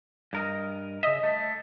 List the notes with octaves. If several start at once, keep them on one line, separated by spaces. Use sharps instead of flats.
G2 A#4 D#5
C#3 D#5 E5
A3